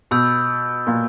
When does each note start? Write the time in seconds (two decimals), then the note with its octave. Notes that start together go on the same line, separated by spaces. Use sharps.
0.11 B2 B5 E6 G6
0.87 A#2